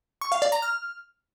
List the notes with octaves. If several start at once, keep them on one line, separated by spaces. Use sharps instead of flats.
C#6
F5
D5
A#5
F6